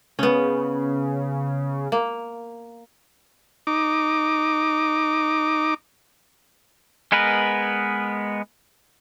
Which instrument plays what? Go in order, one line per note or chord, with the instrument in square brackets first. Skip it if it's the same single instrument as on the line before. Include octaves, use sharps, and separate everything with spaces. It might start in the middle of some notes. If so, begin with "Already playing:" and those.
[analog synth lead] C#3 [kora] B3 C#4
[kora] A#3
[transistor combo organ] D#4 D6
[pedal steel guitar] G#3 B3 G#4 A#4 B4